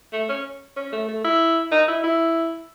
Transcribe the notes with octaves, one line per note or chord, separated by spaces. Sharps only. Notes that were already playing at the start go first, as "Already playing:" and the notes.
A3
C#4
C#4
A3
A3
E4
D#4
E4
E4